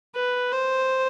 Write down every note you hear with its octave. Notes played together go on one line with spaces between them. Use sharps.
B4
C5